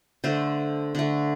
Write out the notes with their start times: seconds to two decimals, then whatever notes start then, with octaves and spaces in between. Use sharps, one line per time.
0.24 D3 A3 C5
0.95 D3 A3